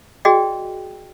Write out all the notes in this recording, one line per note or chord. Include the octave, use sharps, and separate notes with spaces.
F#4 G#4 D5 D#5 G5